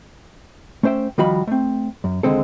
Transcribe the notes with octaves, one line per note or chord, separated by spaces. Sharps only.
A3 C#4 C5 E5 G5
D#3 F3 G3 F#4 F5 B5
A3 C4
F#2
D#2 G#2 D3 G#3 C4 A4